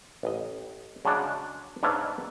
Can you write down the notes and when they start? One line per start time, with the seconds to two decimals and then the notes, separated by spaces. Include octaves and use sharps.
0.23 A1 D#5
1.05 C#3 F#3 G#3 D4 F#5
1.83 G#2 D4 B4 C#5 E5 F5